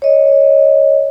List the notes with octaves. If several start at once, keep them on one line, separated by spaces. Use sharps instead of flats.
C#5 D#5